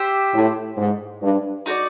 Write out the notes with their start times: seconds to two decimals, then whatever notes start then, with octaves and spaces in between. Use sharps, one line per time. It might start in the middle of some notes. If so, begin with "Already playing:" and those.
Already playing: G4 C5 E5
0.34 A2
0.77 G#2
1.22 G2
1.66 D#4 F#4 A4 D5